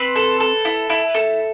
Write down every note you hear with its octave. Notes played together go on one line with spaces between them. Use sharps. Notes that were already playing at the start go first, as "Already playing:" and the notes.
Already playing: C4 B4
A4
A4
E4
E4
A4